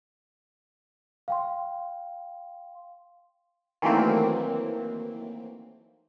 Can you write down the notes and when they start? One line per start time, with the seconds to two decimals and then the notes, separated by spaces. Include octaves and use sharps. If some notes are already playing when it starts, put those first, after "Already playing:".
1.28 F5 G5 C6
3.82 D#3 E3 F#3 A3 A#3 C4